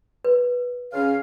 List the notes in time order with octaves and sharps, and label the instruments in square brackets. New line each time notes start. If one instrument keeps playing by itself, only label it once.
[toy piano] B4
[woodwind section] C#3 C#4 F5